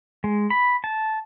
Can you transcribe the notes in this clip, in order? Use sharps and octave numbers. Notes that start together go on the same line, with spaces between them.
G#3
B5
A5